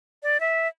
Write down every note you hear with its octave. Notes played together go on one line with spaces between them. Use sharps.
D5
E5